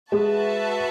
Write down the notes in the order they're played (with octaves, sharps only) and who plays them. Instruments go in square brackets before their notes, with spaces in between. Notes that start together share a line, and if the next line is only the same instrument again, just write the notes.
[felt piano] G#3 [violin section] F#4 B4 E5 A5